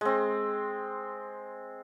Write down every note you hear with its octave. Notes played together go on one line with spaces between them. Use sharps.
G#3 C4